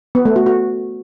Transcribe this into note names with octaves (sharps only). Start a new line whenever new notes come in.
B3
A3
F#4
F#4